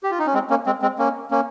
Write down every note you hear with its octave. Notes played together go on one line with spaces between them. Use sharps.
G4
F4
D#4
C#4
G#3 C4
A#3 C#4
G#3 C4
G#3 C4
A#3 C#4
A#3 C#4